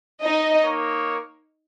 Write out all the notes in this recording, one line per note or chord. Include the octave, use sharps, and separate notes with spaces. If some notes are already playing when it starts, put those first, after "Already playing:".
D#4 D#5
A#3 D#4 A#4 C#5